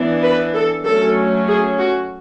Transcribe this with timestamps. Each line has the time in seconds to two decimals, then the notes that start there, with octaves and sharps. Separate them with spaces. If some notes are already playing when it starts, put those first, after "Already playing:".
Already playing: E3 B3 D4
0.22 B4
0.53 A4
0.84 F#3 A3 C#4 A4
1.47 G#4
1.79 F#4